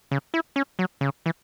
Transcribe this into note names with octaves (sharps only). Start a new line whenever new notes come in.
C#3
E4
C#4
F#3
C#3
E3